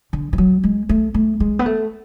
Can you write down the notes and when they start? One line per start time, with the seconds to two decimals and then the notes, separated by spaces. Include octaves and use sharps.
0.13 D3
0.33 E3
0.38 F#3
0.64 G#3
0.89 A3
1.14 A3
1.40 G#3
1.59 B3
1.66 A3